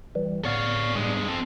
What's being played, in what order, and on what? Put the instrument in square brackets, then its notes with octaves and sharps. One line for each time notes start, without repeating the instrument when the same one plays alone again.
[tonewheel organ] E3 G3
[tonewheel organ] A2 B3 D5 [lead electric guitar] C#5 F5
[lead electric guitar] G2 G#3
C4 A4